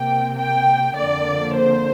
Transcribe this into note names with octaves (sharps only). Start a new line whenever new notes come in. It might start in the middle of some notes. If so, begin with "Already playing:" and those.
Already playing: C3 A#3 G5
G5
F2 D3 A#3 D5
C5